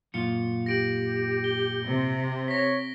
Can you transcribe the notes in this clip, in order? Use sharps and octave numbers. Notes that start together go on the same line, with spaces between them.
F#2 A#2 F4 C#7
G4 A#6 D7 F#7
G7
C3
C#5 A#6 B6